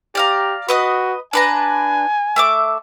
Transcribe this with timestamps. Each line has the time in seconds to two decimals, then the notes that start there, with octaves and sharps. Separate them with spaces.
0.15 G4 D5 F5 A#5
0.68 F#4 B4 D#5 D#6
1.33 D4 B4 G#5 A#5
2.36 A3 E5 D6